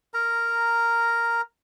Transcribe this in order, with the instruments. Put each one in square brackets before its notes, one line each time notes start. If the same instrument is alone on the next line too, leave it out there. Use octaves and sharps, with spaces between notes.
[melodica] A#4 A#5